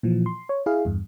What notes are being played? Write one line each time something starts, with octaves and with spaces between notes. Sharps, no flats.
A#2 E3 F3
C6
C#5
E4 G#4 F5
E2 G2